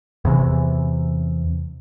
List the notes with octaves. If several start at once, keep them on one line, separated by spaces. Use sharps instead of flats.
E2 C3 E3